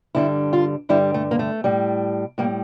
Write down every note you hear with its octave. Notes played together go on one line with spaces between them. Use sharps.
G2 D3 G3 E4
F4
G2 D3 G3 E4
A3
A#3
A3
A2 G3
A2 G3 A#3